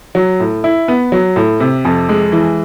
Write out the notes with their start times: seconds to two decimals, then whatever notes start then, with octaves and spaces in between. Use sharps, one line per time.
0.15 F#3
0.40 A2
0.64 E4
0.88 B3
1.12 F#3
1.36 A2
1.60 C3
1.85 F2
2.09 G#3
2.32 E3